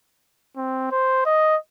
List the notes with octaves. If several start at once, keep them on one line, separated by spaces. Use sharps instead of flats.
C4
C5
D#5